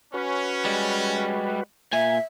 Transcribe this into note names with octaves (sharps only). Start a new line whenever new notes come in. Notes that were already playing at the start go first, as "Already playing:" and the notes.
C#4 F#4 B4
G3 G#3
A#2 E5 G#5